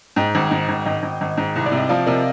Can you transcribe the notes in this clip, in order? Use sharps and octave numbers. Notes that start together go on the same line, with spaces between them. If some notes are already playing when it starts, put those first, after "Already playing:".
G#2 D#5 G5
G#1
G#2
G#1
G#1 D#5 G5
G#1
G#1
G#2
C2
D5
C3
D#5
F3 D5 F5
C3 A#4 D5